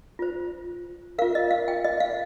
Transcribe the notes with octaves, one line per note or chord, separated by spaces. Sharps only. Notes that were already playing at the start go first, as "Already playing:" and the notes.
F4 C5
F4 A#4 F5
D#5
F5
G5
D#5
F5